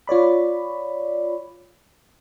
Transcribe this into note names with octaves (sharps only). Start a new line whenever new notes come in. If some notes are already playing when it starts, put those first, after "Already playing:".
F4 C#5 D5 B5